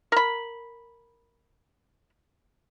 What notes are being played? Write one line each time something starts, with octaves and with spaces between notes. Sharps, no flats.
A#4 B5